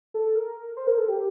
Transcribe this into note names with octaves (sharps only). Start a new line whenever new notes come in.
A4
A#4
C5
A#4
A4
G4